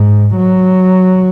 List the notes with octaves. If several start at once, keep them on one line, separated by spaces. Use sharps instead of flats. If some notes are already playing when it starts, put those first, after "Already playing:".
Already playing: G#2
F#3